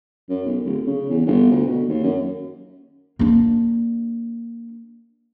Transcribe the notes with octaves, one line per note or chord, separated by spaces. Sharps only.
F#2
B1
D1
C#3
E2
G1
D2
B2
D#2
F#2
A#3 D4